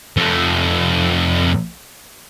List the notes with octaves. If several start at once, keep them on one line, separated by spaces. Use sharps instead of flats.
F2 A3